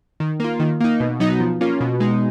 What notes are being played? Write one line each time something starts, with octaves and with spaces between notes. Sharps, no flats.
D#3
A#3 F4
D#3
A#3 D#4
B2
F#3 B3 D#4
F3
A#3 C#4 F4
B2
G#3 D#4